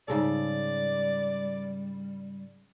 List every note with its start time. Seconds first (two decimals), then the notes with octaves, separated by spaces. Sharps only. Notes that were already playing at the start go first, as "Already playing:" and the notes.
0.08 G#2 C#3 G3 A4 D5